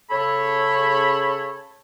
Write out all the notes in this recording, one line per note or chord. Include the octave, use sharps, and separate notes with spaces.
C#3 A4 C#5 B5